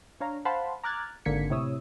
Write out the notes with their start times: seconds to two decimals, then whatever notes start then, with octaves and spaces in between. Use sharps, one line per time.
0.20 D4 C#5 F5 A#5
0.45 C5 F5 F#5 A5 B5 C6
0.84 A#5 D6 F6 F#6 G#6 A6
1.25 G#1 D3 A#3 G#6 B6 C#7
1.50 A2 C3 E4 C#5 D#6 E6